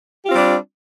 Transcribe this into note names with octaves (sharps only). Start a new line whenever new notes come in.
G3 C4 D4 F4 G4